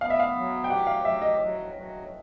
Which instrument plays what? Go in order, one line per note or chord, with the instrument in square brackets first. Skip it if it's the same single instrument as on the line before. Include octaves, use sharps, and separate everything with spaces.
[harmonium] B3 [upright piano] F5
[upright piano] E5
F5
[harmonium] F#3
[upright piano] G5
[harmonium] G4 [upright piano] F#5
[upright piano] F5
[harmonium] F#3 [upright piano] E5
[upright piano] D#5
[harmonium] F#3
F#3